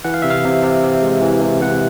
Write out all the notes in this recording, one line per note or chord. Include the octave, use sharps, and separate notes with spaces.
E3 F#5
F5
C3 E5
F5
C3
C3
C3
G#3
E3
C3
C3 F#5